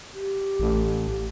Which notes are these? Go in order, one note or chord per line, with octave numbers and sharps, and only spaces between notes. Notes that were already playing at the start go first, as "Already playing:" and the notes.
G4
A1